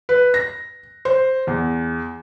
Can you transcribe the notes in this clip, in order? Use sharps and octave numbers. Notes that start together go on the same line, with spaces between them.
B4
A#6
C5
E2